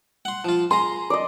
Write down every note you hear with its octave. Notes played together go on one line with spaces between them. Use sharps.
F#5 C6
F3 F4
G#4 A#5 C6
D5 D#5